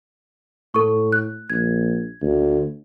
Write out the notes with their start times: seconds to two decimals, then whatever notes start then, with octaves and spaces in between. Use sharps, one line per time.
0.74 A2 A4 C#6
1.12 F#6
1.50 A#1 G#6
2.22 D2